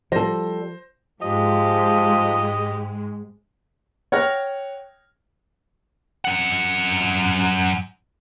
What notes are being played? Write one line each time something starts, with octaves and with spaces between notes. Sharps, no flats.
F3 G3 A4 C5 A#6
G#2 F3 G#3 G4 D#5
C#5 F#5 G5 F6 A#6
F#2 F#5